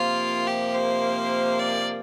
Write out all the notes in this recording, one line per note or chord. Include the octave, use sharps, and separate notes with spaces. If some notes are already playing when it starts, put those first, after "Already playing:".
Already playing: C3 F3 A#3 F4
G4
C5
D5